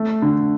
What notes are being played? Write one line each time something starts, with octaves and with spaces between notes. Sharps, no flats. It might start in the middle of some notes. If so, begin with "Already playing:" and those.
Already playing: A3
D3